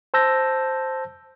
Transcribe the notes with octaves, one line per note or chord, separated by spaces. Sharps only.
C5 A5 E6 G6 A#6